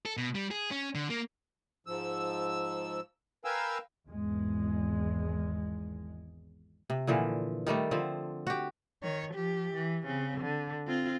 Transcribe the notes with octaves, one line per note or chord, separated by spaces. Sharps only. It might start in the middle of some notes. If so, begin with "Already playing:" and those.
A4
B2
G3
G#4
C#4
D3
A#3
G#2 F3 E6
A#4 B4 F5 G5 G#5 E6
G#1 E2 G#3
C3
A#2 D3 E3 F3
D#3 G3 A3 D4
D3 F3 C4
F#4 G4
D#3 C#5
F3 G4
E3
C#3 C4
D3
C4 F4